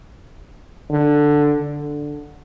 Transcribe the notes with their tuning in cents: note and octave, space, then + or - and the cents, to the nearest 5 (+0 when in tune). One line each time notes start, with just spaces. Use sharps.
D3 +5
D3 +0